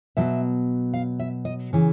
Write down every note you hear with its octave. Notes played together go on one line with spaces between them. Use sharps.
B2 F#3 E5
F5
E5
D#5
C#3 E3